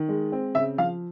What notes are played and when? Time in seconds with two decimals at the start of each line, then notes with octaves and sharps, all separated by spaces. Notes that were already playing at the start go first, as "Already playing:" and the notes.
Already playing: D#3
0.08 G#3
0.32 C4
0.55 C#3 E5
0.78 F3 F5